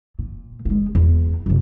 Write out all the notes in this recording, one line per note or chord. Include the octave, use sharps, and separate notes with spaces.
A#2
G#3 A#3
E2
F#2 C3